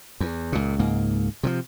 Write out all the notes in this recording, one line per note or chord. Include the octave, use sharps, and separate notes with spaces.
E2
C#2 A#2
C#2 G#2 A#3
C3 E3 F3